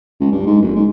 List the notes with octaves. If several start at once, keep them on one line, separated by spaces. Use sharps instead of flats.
C#2
G2
G#2
F#1
G#2